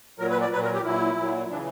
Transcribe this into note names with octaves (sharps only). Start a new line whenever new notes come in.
A#2 F#3 A#4
B4
D5
A#2 F#3 B4
A#4
G4
A#2 F#3 E4
A#2 F#3
C#3 E3 D4